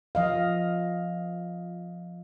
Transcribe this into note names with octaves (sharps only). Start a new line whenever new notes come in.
F3 D#5 F5